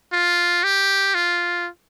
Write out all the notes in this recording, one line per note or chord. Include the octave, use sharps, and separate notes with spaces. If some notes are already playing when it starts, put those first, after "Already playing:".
F4
G4
F4